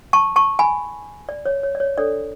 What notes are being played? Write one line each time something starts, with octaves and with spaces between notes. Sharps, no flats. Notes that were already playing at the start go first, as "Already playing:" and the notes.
A5 C#6
A5 C#6
G#5 B5
D5
C#5
C#5
D5
C#5
D4 A4 C#5 D5